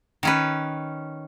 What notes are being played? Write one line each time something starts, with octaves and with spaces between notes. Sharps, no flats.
D#3 C#4 B4